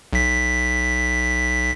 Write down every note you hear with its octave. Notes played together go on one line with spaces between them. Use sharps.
B1 B6